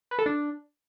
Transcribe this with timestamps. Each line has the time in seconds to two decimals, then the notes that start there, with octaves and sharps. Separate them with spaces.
0.11 B4
0.19 A4
0.26 D4